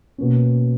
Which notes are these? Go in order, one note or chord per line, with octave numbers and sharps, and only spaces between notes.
B2 A#3 C#4